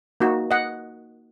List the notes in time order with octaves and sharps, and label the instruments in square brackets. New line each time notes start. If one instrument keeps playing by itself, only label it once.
[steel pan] A#3 D#4 F#4
D#5 F#5